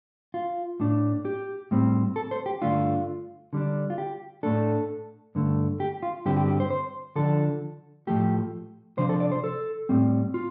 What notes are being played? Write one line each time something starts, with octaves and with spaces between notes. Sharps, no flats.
F4
A2 A3 D4
G4
A2 G3 C4
A4
C5
G4
G2 D3 A3 D4 F4
D3 G3 D4
F4
G4
A2 A3 D4 A4
G2 D3 A3
G4
F4
G2 D3 G3 C4 G4
G4
G4
C5
C5
D3 F3 D4 A4
A2 F3 A3 G4
C3 F3 D4 C5
A4
D5
C5
A4
A2 G3 C4
F4